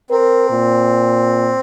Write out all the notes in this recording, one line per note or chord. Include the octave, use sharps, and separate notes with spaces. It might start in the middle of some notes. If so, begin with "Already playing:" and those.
C4 A#4
A#2